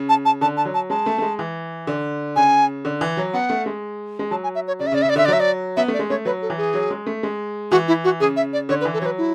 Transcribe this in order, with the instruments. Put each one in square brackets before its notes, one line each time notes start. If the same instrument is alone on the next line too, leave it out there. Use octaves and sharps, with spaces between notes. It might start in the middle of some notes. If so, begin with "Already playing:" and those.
Already playing: [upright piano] C#3
[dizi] A5
A5
[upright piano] D3 [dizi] A5
[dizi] A5
[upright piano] F#3
[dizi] A5
[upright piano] G#3 [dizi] A5
[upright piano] A3
A3
G#3
E3
D3
[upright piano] C#3 [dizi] G#5
[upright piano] D3
E3
F#3
[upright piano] B3 [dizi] F#5
[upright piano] A3
G#3
G#3
[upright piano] F#3 [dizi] A5
[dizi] G#5
E5
C#5
[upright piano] C#3 [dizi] D5
[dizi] E5
[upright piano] C#3
[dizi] D5
[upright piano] C#3 [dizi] E5
[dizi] D5
[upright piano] D3 [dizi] E5
[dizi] D5
[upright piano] F#3 [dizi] E5
[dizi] D5
[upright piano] B3 [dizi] E5
[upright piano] A3
[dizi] D5
[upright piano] G#3
[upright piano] A3 [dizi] C#5
[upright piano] F#3 [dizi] B4
[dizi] A4
[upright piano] E3
[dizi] G#4
[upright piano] F#3
G#3
A3
G#3
[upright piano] E3 [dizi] F#4
[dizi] E4
F#4
[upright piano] C#3 [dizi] G#4
[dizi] E5
D5
[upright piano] D3 [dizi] C#5
[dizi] B4
[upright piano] E3
[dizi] A4
[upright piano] F#3 [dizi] B4 C#5
[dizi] E4